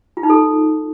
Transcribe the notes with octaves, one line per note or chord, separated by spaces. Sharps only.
F4
D#4
A4